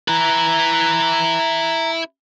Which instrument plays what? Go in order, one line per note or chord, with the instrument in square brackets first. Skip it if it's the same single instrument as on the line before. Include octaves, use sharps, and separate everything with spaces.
[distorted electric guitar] E4 B4 [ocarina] A#5